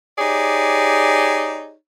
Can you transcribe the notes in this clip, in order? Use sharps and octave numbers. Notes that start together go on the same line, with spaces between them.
D#4 G4 G#4 C#5 D5